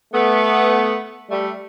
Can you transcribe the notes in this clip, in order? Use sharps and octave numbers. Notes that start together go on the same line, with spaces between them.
A3 B3
G3 A3